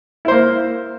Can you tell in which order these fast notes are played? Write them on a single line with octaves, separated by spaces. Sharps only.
E4 C5 A#3